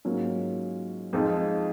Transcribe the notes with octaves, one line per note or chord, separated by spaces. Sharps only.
G#2 F#3 A#3 C#4 F4
F2 F3 G#3 D#4